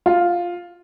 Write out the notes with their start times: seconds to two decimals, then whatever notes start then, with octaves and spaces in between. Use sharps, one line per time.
0.06 F4